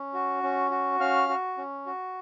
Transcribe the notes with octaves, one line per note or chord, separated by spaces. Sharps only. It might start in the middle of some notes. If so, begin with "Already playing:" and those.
Already playing: C#4
F#4
C#4
F#4
C#4 F5 F6
F#4
C#4
F#4